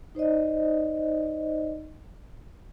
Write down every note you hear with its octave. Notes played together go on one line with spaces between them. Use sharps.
D#4 C5 D5 D#5